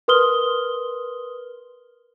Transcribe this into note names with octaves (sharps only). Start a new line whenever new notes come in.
A#4 B4 C6 D#6 F6 G7